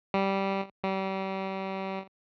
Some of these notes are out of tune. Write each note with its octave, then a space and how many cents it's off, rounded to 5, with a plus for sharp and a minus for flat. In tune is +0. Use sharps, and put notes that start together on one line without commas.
G3 -10
G3 -35